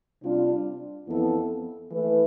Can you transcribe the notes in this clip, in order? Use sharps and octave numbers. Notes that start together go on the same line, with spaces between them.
C3 G3 D4 F4
F2 E3 B3 E4 A4
E3 A3 E4 B4